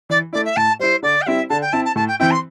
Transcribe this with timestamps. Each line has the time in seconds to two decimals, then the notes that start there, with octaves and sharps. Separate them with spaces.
0.10 E3 D5
0.33 A3 E4 D5
0.45 E5
0.57 A2 A5
0.79 G3 E4 C5
1.03 D3 D5
1.22 G5
1.26 G3 C4 E4 E5
1.50 D3 A5
1.62 G5
1.73 C4 E4 A5
1.85 A5
1.96 A2 A5
2.08 G5
2.20 E3 C4 E4 G5
2.31 C6